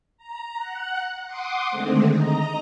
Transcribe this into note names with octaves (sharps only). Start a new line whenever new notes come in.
A#5
F#5 F#6
F#5 C6 D6 D#6
D3 D#3 G#3 A3 C4
D#5 A#5